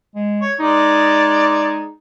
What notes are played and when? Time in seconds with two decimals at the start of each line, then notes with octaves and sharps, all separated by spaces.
0.15 G#3
0.41 C#5
0.60 G#3 D#4 D5